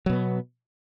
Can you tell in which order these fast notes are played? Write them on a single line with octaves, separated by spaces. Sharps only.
F#3 B2 B3